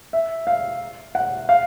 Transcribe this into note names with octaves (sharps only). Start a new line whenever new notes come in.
E5
F5
F#5
F5